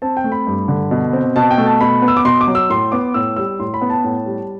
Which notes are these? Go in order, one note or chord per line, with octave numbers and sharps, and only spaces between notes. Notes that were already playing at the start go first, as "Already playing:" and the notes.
C4 A5
G5
A3
B5
G2
D3
B2
C4
B2 A5
G5
A3
A5
B2 B5
B3
E6
D6
B2 C6
D6
F#3
E6
A2 C6
B3 D6
A2 E6
G3 E6
A2 C6
B5
B3
A5
A2
G3